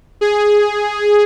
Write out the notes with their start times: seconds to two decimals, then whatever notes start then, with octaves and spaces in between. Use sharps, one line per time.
0.21 G#4